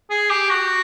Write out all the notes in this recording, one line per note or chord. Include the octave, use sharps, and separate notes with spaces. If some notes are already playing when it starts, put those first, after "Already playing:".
G#4
G4
F#4